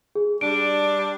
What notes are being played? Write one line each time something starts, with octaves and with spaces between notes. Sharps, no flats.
G#4
G3 D4 D7